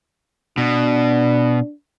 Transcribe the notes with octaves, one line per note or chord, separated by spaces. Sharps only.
B2 D4